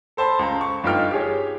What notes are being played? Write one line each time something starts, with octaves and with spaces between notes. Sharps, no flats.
A4 C5 A5 B5 C6
C#2 A#5
C#6
G1 D#4 F4 G5 F6
G4 G#4 C#5